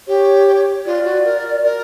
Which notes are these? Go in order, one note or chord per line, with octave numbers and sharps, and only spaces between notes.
G4 C#5
F4 D5
F#4
A#4
A#4